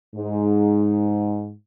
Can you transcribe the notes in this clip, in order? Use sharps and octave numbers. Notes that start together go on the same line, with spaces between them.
G#2